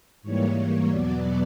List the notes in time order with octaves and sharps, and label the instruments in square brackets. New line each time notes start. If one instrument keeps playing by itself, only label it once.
[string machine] G#2 E3 G3 A#3 C#5
E2 B2 F#3 B3 D5